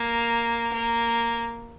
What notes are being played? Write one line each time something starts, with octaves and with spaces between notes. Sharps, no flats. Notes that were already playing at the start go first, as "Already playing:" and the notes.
Already playing: A#3
A#3